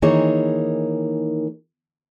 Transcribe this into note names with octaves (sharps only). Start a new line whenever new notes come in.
D#3 E3 A#3 D#4 G#4 C#5